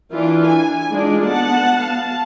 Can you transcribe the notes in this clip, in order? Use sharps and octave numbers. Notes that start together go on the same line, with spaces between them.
E3 D4 F4
G#5
G#3 D4 D#4 F4
B3 F#5 A5
F5 A5